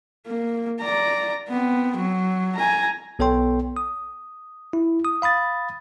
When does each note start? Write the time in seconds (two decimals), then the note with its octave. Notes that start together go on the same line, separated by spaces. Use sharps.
0.27 A#3
0.80 D5 A#5
1.50 B3 C4
1.96 F#3
2.56 G#5 A#5
3.19 B1 B3 A4 C#5 G5 C6
3.77 D#6
4.73 E4
5.05 D#6
5.22 F5 B5 D#6 A6